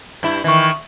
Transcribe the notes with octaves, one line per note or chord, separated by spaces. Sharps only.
G2 E4
D#3 E3 E5 C#6